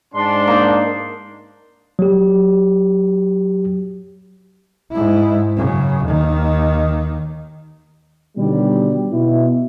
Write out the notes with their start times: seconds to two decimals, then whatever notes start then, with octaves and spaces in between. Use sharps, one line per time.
0.14 G#2 D4 C6
0.47 A#3 D#4
1.99 F#3 G4
4.92 G#2 E4
5.56 F#2 C#3
6.05 D#2 D#3
8.37 B2 D3 D#3 F#3 G3
9.12 B2 E4